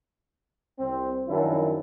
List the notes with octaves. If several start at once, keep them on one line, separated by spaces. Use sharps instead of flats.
C2 C4
F#2 D#3 F3 D4 E4